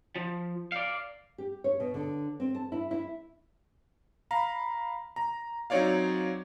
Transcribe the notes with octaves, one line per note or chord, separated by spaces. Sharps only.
F3
D5 F5
G4
C#5
B2
D3
C4
A5
E4
E4
F5 A#5 B5
A#5
F#3 C4 D#4 C#5 D5 F5